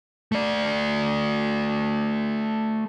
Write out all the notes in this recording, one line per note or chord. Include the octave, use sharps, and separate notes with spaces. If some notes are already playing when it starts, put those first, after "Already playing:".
A3 D5